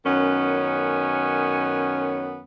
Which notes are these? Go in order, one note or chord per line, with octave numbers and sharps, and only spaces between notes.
F#2 D#3 B3 C#4